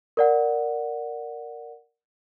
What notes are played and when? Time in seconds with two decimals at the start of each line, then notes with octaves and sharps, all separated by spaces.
0.17 A#4 D5 F#5